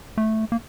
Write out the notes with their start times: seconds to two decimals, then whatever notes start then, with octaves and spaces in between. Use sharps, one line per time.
0.18 A3
0.52 A#3